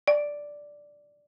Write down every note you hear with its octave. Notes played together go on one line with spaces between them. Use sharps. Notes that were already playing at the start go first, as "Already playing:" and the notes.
D5